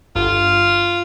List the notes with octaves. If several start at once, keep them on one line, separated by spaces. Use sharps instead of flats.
G1 F4